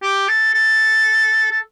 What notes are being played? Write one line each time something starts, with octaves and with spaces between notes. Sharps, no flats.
G4
A4
A4
A4